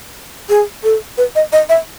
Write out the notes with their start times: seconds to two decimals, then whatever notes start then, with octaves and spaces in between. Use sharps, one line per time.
0.49 G#4
0.84 A4
1.18 B4
1.36 D#5
1.53 D#5
1.69 E5